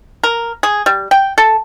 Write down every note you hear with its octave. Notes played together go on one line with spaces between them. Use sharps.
A#4
G#4
G3
G5
A4